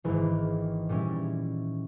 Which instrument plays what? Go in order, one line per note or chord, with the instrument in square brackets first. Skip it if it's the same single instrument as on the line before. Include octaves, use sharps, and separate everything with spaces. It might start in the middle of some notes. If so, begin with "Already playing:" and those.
[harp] G#1 G#2 D#3 A#3 [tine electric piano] E3
[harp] A#2 G3 C#4 E4